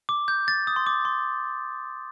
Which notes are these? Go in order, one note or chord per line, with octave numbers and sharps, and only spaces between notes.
D6
G6
A6
D#6
C6
D6
C6